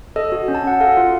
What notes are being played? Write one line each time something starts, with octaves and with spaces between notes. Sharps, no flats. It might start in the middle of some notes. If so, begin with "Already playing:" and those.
A4 D#5
F#4
C#4
A5
C#4 F#5
A4 F5
F4